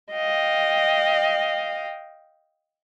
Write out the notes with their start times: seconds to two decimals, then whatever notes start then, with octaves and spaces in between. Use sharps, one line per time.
0.13 D#5 F5 G5